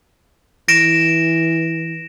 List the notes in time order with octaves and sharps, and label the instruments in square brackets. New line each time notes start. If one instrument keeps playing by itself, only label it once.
[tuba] E3 [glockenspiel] A#6 D7 E7